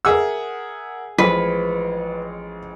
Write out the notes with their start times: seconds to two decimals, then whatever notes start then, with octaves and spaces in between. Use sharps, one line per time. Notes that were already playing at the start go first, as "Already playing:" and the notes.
0.05 G#4 A#4 E5 F#5 E6
1.18 A1 F3 G#3 B4